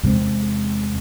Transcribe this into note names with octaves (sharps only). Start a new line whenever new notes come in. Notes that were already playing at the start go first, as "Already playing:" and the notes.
E2 C3 G#3 C4